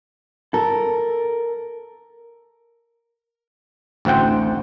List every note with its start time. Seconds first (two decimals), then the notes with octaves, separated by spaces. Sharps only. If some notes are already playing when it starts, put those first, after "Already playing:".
0.54 A4 A#4
4.05 A1 D2 C4 F#5 G5